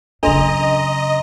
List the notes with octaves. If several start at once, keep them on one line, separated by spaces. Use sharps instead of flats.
F#2 C#3 D4 A4 D#5 A#5 C6 F7